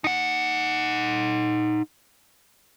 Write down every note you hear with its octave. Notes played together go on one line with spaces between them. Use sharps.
D#4 F#5